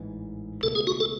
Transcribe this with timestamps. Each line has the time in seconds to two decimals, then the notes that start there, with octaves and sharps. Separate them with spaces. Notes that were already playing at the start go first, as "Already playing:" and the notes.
Already playing: A1 G#2 E3
0.63 C#2 B2 A3 A4
0.75 G#4
0.87 F#4
1.00 A4